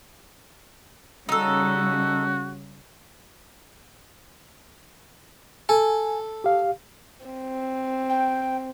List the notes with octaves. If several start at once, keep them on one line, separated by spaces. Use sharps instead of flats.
C#3 G3 C#4 D#4 F#4 A4
A4 G#5
G4 F5
C4
G5